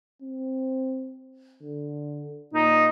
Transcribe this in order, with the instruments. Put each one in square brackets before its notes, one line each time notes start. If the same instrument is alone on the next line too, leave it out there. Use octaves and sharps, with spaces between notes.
[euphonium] C4
D3
[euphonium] A#2 [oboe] D#4